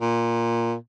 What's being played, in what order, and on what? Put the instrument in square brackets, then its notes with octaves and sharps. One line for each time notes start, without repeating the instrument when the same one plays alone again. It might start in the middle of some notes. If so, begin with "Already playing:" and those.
[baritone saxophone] A#2